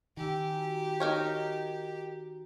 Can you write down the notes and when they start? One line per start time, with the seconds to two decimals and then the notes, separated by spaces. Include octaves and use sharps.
0.17 D#3 G4 G#5 A#5 E6
0.55 F#4 A#5
1.00 D#4 A#4 C#5